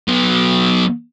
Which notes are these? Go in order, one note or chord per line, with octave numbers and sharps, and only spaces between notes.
F#3 B3